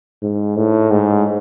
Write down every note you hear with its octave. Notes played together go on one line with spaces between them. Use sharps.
G#2
A2
G#2